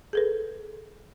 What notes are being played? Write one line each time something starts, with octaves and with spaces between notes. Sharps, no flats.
G#4 A4 B4